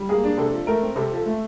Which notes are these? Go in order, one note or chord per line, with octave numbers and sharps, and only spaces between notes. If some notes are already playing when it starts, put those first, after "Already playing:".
Already playing: G3
A#3 G#4
D4
C3 A4
F3
A3 A#4
C4
C3 A4
F3 A4
A3